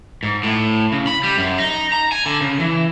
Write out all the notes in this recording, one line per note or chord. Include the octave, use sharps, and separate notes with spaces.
G#2
A2
C#3
B5
G3
F#2
D#4
A#5
G#5
D3
C#3
E3